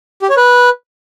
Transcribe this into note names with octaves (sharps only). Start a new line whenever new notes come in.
G4
C#5
B4